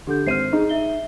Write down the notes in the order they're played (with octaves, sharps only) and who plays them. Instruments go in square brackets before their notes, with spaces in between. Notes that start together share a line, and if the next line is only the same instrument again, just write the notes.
[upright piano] D3 [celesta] G4 A4 G6
[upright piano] G#1 C5 D#7 [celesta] F6 C7
[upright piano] D#4 [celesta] G#4
[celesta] E5 G7